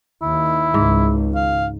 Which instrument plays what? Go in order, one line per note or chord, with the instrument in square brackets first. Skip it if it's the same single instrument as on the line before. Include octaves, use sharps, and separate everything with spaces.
[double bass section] D#2 [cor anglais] E4
[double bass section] G#1 C#2 [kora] G#2
[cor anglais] F5